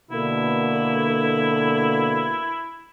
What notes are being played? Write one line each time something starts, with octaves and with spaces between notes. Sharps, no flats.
B2 D3 A#3 E4